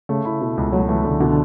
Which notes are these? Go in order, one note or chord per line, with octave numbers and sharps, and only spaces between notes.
C#3 A3
E4
B2
C#2
F#3 A3
E3 A3
C#2 D3
B2 D3